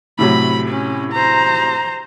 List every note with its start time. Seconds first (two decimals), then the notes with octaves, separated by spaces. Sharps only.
0.19 A2 C3 F#3 B5
0.68 C#4
1.12 C5 A#5